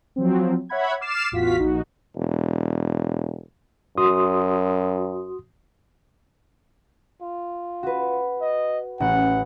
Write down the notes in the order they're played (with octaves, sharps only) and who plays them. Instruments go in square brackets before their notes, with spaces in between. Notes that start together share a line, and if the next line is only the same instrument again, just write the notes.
[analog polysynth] F3 F#3 C4
C#5 E5 F#5 B5 G#6
D6 F6 A6 C7 E7
A1 E2 F4 F#4 F5 B6
A#1 D#4 F#4
[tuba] E1
[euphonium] F#2 [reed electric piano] F#4 C6 D#6
[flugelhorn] F4
[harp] F#4 B4
[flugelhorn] D#5
[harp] A1 [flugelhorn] F#5